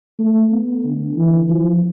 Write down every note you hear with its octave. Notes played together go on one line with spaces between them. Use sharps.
A3
B3
D3
E3
F3